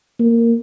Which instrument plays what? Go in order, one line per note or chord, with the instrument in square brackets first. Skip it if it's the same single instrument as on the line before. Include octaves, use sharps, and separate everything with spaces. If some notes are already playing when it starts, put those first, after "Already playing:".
[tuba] A#3